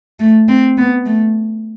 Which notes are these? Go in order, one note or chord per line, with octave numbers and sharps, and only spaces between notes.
A3
C4
B3
A3